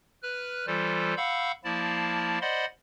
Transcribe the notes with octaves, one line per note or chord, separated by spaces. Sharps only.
B4 F6 F#6
E3 G3 F4 A4 C5
F5 F#5 B5 C#6 E6 G6
F3 A#3 E4 D5 A5
C5 D5 D#5 F#5 B5 C6